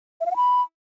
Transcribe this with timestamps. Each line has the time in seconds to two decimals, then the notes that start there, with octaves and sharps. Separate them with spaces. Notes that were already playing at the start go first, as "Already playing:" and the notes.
0.21 E5
0.26 F5
0.31 F#5
0.36 B5